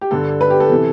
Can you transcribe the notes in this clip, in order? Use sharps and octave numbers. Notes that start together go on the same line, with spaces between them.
G4
G2 D3 A4
B4
G4
A4
C3 E3